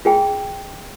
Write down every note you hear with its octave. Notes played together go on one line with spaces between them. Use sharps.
F4 G#4 G5